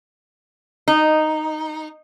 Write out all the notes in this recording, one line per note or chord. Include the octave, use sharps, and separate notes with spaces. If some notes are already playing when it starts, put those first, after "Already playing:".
D#4